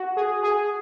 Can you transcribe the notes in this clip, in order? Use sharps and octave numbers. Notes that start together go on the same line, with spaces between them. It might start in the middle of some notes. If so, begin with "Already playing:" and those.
Already playing: F#4
G#4
G#4